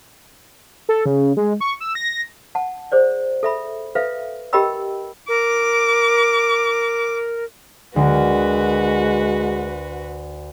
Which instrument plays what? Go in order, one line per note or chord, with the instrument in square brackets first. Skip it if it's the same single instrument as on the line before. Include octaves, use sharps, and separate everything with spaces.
[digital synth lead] A4
C#3
G#3
C#6
E6
A#6
[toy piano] F#5 A5
G#4 C5 D5
A4 E5 B5
A4 B4 E5 F5
G4 A#4 D#5 G5 B5 E6
[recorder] A#4 [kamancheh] D6
[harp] D2 A#4 [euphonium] G#3 [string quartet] F#4 B4